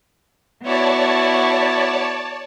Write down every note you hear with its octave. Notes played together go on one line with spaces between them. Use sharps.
B3 E4 F#4 C#5 D5 A5